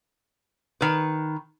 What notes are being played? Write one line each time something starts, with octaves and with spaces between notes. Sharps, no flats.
D#3 B4